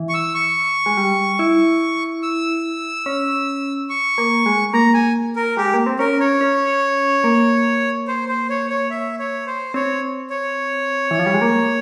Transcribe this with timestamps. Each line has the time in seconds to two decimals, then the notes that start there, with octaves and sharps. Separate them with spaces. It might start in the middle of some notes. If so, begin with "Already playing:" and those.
Already playing: E3
0.09 C#6
0.14 E6
0.34 C#6
0.86 G#3
0.97 G3
1.39 E4
2.23 E6
3.06 C#4
3.90 C#6
4.18 A#3
4.46 G#3
4.74 A#3 A#5
4.94 G#5
5.36 A#4
5.57 G#3 G4
5.74 A#3
5.86 C4
5.99 C#4 A#4
6.20 C#5
6.41 C#4
7.24 A#3
8.08 C5
8.28 C5
8.50 C#5
8.70 C#5
8.91 E5
9.19 C#5
9.47 C5
9.74 C4 C#5
10.30 C#5
11.11 E3
11.19 F3
11.26 G3
11.34 G#3
11.41 A#3